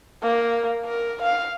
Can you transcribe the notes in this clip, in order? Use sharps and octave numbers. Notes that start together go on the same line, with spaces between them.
A#3
A#4
F5